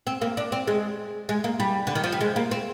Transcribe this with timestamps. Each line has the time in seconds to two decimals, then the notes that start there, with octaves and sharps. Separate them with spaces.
0.07 C4
0.21 A#3
0.37 D4
0.52 C4
0.67 G#3
1.29 G#3
1.44 A#3
1.60 G3
1.87 D3
1.95 D#3
2.04 F3
2.12 G3
2.21 G#3
2.36 A#3
2.51 C4